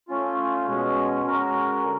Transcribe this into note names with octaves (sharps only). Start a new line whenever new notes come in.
A3 C#4 F4
B2 G#3 C#4
G#3 C#4 F#4 A#4
D3